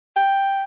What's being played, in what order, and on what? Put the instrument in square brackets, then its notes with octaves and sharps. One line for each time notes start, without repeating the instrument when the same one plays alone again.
[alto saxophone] G5